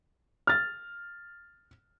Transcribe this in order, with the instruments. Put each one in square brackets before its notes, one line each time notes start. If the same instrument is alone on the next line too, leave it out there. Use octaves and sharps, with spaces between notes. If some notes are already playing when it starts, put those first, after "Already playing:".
[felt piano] F6 A6